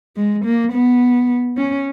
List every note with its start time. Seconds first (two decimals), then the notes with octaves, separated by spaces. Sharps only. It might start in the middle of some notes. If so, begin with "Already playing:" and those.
0.17 G#3
0.45 A#3
0.73 B3
1.57 C#4